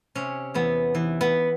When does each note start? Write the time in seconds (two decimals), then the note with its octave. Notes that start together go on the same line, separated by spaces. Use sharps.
0.15 C3 C#4
0.54 E2 B3
0.95 E3
1.21 B3